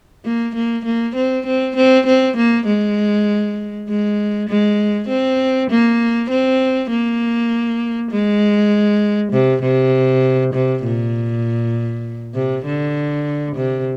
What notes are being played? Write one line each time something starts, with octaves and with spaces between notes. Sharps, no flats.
A#3
A#3
A#3
C4
C4
C4
C4
A#3
G#3
G#3
G#3
C4
A#3
C4
A#3
G#3
C3
C3
C3
A#2
C3
D3
C3